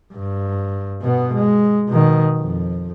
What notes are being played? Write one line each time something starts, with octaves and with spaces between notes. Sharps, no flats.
G2
B2 B3
G#3
B2 D#3
F2